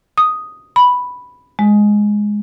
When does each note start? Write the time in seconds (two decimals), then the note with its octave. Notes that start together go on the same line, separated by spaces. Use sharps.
0.18 D#6
0.76 B5
1.59 G#3